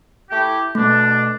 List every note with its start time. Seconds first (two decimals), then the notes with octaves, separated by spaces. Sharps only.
0.29 A3 E4 G4
0.75 B2 A3 D4